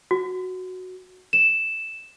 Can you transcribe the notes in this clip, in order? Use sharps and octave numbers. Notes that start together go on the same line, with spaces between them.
F#4
E7